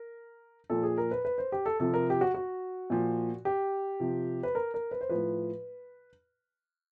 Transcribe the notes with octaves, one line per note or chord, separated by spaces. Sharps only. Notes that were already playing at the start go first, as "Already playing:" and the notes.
Already playing: A#4
A#2 F3 A4
G#4
A#4
B4
B4
C5
G4
A4
C3 F3 A4
A#4
G4
F#4
F#4
A#2 F3
G4
C3 F3
B4
A#4
A#4
B4
C5
A2 F3 B4